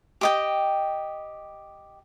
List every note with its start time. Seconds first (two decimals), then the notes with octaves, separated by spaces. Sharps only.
0.21 G4 D#5 G5